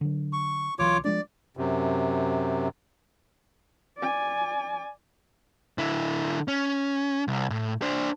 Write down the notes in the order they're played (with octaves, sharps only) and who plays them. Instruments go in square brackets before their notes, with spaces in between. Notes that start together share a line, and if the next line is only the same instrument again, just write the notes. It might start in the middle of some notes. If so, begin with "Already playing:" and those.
[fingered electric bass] D3 F#3
[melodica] C#6
[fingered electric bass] B1 E3 F#3 [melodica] F4 C#5 D6
[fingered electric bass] F3 G#3 D4 [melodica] D5
[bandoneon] F#2 C3
[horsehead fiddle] D5 G#5
[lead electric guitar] D3 E4
C#4
C2
A2
D4 C5